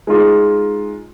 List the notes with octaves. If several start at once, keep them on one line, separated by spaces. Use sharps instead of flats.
G#3 D#4 F4